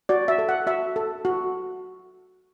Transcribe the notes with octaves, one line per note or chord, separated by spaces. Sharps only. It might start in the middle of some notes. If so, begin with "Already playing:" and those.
F#4 D5
E5
A4
F#5
F#4 E5
A4
F#4